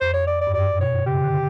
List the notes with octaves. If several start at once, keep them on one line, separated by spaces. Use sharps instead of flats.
F2 C5
C#5
D5
D5
G2
F#2 D5
B2 C#5
C#3 G4
D3